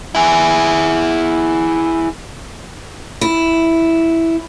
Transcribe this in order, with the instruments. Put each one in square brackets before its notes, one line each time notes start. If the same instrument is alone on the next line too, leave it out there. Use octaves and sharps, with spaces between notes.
[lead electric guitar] E4 G#4
[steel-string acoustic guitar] E4